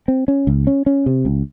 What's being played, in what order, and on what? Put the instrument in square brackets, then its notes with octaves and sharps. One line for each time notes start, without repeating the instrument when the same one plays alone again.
[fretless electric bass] C4
C#4
C#2
C#4
C#4
C3
C#2